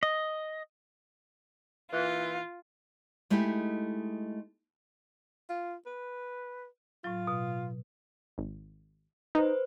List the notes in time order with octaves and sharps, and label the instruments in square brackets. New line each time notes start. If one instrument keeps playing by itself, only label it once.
[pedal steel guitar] D#5
[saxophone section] A#2 E3 [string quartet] F4
[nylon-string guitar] G#3 A3 D#4 E4 G4
[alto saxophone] F4
B4
[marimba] A2 F#3 [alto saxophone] F4
[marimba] B2
[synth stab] G#1
[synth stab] D#4 [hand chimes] B4 C5